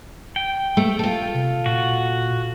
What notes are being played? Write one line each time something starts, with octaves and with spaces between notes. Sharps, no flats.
G5
A3
F4 A4
C3
A#2 F#4